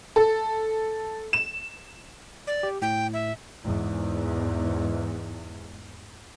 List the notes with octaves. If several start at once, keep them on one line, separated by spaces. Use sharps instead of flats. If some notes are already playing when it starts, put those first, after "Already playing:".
A4
E7
D5
G4
A2 G5
E5
E2 G#2